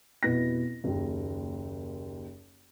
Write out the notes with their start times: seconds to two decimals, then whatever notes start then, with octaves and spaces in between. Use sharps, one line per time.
0.23 F1 B2 E4 B4 A#6
0.84 F#1 D#2